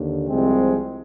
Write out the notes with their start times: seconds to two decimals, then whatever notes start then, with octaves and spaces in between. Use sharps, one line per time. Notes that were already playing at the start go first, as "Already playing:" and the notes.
Already playing: D#2 D3
0.28 C2 C3 F3 G#3 C4